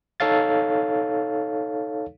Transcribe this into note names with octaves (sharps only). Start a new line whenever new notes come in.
D#4 A4 C#5 F5 A6